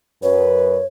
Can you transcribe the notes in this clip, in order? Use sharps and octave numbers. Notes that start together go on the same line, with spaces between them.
F#2 B4 C#5